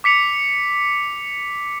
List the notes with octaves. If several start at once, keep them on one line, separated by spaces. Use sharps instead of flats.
D6 B6 C#7 F7